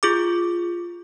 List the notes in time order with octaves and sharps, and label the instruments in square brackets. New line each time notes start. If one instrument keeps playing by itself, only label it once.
[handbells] F4 G#4 D6